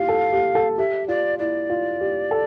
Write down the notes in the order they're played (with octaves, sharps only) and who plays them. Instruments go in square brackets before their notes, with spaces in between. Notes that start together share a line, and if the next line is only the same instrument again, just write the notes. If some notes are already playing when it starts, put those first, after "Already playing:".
Already playing: [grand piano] E4 F4 G4 [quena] F5
[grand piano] A4
G4
A4
[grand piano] G4 [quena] E5
[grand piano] F4 [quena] D5
[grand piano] E4 [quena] D5
[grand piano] F4
G4
A4